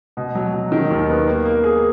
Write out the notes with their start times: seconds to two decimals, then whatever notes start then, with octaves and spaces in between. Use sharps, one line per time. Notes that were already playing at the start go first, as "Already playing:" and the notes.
0.17 B2
0.35 F#3
0.53 F#3
0.72 D#3
0.91 D#2
1.09 B3
1.27 A#3
1.45 A#3
1.64 G#4